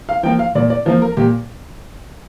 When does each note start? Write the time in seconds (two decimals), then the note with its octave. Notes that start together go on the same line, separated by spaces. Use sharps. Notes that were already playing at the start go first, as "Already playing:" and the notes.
0.09 F5
0.23 F3 A#3 G5
0.39 F5
0.55 A#2 D5
0.70 D5
0.85 F3 A#3 C5
1.02 A#4
1.17 A#2 G4